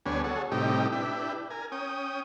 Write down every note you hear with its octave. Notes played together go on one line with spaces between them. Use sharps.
D2 G3 B3 D4 C#5 G#5
F#4 G#4 A4 C#5
A2 C3 G3 D#4 G4
D4 E4 G4 B4
A#4 G#5
C#4 G5 D#6